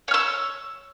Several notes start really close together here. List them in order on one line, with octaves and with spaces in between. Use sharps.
C#5 F6 E6